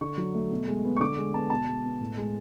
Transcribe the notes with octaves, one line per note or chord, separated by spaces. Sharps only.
D3 C#6
F#3
A3
B2
G#3
B3
C#6
D3 D6
G#3
B3 A5
B2 A5
G#3
B3
A2
G#3